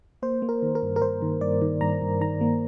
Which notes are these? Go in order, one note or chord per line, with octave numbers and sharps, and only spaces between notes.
A#3 C5
A#3
A#4
D#3
A#4
G2
A#4
G2 C5
D#3
G2 D5
D#3
G2 A#5
G2
D#3 A#5
A#3